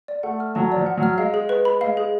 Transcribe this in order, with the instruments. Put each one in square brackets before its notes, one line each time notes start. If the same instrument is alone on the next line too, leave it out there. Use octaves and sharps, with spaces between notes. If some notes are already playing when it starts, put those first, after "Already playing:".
[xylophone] D5
[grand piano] A3 [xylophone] F#5
[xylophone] F6
[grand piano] F#3 [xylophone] A5
[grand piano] F3 [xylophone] D5
[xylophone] F#5
[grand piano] F#3
[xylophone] F6
[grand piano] G#3 [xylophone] F5
[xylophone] G#4
B4
B5
[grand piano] G#3 [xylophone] F5
[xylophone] G#4